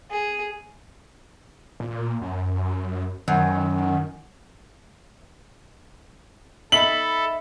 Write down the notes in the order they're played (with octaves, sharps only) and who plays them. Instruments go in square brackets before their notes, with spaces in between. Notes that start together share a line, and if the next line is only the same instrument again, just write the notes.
[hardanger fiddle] G#4
[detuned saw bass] A#2
F#2
[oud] F#2 [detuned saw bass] D#3
[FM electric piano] D#4 E5 B5 [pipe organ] A4 [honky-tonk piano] F#7